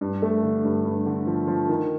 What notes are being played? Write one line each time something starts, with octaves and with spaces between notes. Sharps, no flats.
G2
A3
D3
G2
G2
D3
F3
F3
D#3